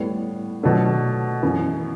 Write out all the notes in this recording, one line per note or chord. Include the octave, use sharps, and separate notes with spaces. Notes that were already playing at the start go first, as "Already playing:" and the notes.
Already playing: A2 G3 B3
B2 F#3 A3 D4
F#2 E3 B3 E4